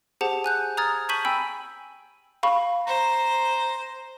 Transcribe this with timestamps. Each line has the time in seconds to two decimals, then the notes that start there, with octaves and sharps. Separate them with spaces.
0.21 G4 G#4 C5 F#5 A5
0.44 G#5 F#6 G6
0.77 A#5 D#6 F6 G#6 A6
1.09 A5 C#6 G6 B6 D#7 F#7
1.25 G5 G#5 B5 E6 D#7
2.43 F5 B5 C#6
2.87 C5 A#5